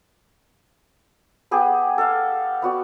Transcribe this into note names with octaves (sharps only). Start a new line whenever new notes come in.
B3 G4 G#4
A4 F5
B3 F#4 D5